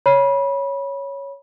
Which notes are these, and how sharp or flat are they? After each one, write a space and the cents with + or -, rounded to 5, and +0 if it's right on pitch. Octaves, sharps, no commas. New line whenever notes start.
C#5 +0 B5 -25